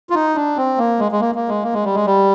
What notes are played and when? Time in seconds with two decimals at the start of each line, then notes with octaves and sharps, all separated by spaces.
0.10 F4
0.14 D#4
0.35 D4
0.57 C4
0.78 A#3
0.99 G#3
1.12 G#3
1.20 A#3
1.35 A#3
1.49 G#3
1.63 A#3
1.73 G#3
1.84 G3
1.95 G#3
2.06 G3